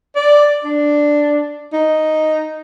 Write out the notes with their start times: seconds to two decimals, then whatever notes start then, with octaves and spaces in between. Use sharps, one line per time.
0.16 D5
0.65 D4
1.73 D#4